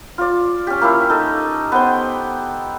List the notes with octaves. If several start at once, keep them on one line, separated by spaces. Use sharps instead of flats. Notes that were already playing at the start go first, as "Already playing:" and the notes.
F4 D5
C#4 G4
A#3 C#4 E4
D#4 A4
B3 C5 G5